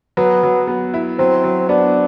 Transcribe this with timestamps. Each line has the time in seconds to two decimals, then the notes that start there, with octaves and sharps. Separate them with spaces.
0.17 F#3 B3
0.43 F#3
0.67 B3
0.94 E4
1.19 F#3 C4
1.44 F#3
1.69 B3 D4